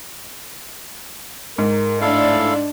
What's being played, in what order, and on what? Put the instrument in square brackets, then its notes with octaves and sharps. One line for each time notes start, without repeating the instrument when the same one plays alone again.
[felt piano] G#2 [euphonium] A#4
[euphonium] A2 [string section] D4 [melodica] E4 A4 F5